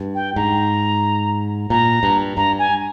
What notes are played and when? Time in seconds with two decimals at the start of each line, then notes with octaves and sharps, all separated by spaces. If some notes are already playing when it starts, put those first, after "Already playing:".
Already playing: G2
0.15 G5
0.36 G#2 A#5
1.70 A#2 A#5
2.03 G2
2.37 G2 A#5
2.59 G#5